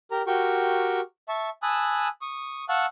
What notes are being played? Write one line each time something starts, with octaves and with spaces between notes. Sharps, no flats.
G4 A#4 A#5
F#4 G4 A#4 G5 C#6
E5 A5 C#6
G#5 A5 B5 D#6 E6 F#6
C#6 D#6
F5 F#5 A5 C#6 E6 F#6